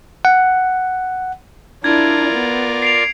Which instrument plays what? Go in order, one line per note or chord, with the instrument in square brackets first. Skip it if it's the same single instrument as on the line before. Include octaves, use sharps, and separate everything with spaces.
[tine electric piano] F#5
[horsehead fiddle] D4 E4 [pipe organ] F4 A#4 D5 [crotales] G#6
[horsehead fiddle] B3
[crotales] C7 D7 F7